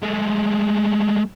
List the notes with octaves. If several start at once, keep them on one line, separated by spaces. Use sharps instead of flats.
G#3 A3